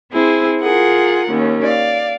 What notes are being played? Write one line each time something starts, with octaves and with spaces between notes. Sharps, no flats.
C4 E4 G#4 C5
F4 G#4 A#4 F#5
D#2 C#4
D5 F5